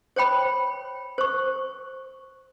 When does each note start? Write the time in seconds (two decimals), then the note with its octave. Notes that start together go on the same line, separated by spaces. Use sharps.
0.16 C5 C#5 G5 B5
1.18 C5 C#6